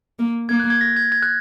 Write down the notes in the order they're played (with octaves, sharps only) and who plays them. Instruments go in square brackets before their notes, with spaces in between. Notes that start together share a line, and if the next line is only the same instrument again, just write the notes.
[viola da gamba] A#3
[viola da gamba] A#3 [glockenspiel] G#6
[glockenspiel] F#6
G#6
A#6
G#6
G#6
F#6